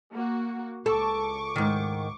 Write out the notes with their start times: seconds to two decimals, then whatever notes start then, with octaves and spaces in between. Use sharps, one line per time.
0.14 A#3 F#4
0.86 C#2 A4 C#6 D6
1.56 G#2 D#3